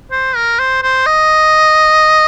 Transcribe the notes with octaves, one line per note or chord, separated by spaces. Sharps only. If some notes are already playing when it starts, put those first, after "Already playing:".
C5
A#4
C5
C5
D#5